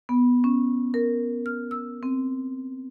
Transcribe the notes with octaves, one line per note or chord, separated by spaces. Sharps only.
B3
C#4
A#4
F6
E6
C4